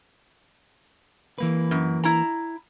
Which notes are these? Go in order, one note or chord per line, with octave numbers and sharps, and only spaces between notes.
E3 A#3 B4
F#2
E4 A#5